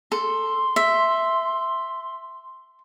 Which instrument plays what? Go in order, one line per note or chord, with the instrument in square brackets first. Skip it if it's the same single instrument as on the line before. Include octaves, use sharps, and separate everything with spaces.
[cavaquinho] A4 [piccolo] C6
[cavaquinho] E5